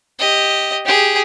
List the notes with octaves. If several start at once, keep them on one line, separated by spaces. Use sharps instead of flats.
G4 D#5
G4 G#4